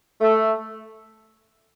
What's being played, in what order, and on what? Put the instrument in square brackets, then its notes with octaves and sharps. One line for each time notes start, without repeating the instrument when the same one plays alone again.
[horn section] A3